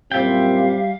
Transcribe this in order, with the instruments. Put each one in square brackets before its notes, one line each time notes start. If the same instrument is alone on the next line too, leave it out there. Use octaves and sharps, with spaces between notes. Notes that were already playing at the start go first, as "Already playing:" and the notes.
[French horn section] F#2 A#2 C4 [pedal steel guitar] G3 E5 G5 [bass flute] G4 [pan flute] F5